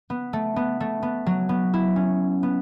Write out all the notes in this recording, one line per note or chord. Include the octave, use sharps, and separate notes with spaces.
B3
A3
B3
A3
B3
F#3
B3
E4
C#4
B3